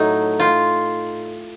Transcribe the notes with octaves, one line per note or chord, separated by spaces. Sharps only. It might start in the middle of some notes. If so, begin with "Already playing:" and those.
Already playing: A2 F#3 A3 D#4
F4